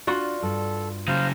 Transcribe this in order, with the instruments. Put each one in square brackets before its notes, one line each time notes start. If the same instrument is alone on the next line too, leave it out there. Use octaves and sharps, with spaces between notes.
[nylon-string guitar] D4 [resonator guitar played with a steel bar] F4 F#4
[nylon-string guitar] G2 [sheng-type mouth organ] A4
[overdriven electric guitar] C#3 F#3 [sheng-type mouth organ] C5 F5